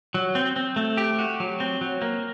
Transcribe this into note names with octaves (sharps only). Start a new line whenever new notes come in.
F#3
C4
C4
A3
G4
F#4
F#3
C4
F#3
A#3